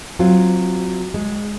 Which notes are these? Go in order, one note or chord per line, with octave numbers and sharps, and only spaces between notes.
F#3 C4 F4
G#3